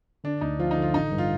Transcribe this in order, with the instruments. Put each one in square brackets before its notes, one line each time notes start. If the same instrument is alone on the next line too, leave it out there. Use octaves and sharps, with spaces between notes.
[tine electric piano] D3 [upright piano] D4
[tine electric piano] D2 [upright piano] D#4
[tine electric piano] F3 [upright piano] F4
[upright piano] D#4
[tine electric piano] D3
[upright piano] F4
[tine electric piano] A1 [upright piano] D#4
[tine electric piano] G2
[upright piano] F4